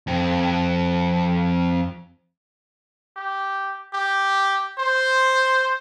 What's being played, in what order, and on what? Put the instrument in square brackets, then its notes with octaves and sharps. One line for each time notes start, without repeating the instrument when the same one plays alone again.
[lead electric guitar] F2 C4
[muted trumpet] G4
G4
C5